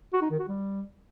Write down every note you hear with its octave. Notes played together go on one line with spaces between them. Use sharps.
F#4
D#4
D#3
F#4
G3